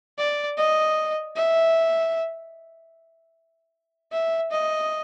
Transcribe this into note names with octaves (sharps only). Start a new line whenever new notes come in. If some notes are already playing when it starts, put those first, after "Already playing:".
D5
D#5
E5
E5
D#5